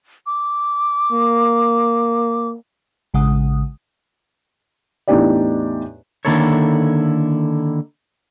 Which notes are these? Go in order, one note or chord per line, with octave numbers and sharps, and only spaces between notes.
D6
A#3
A1 C#3 G#3 F#5 D#6
E2 A2 D4 D#4 G4 D5
D3 D#3 A#3 E4 A4 C#5